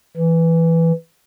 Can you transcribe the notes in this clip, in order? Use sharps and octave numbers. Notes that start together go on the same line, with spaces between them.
E3